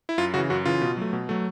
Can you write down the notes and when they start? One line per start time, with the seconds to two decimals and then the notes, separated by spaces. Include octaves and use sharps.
0.09 E4
0.18 F#2 F4
0.34 C#3 E3 F#4
0.50 F#2 F#4
0.66 C#3 E3 F4
0.81 B2
0.97 F#3 A3
1.13 B2
1.29 F#3 A3